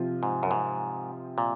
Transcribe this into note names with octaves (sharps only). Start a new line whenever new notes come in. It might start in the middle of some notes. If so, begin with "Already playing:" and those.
Already playing: C3 F3 C4 F4
G#2
F#2
G#2
A#2